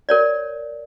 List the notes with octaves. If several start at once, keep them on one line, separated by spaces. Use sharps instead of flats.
A#4 C#5 D5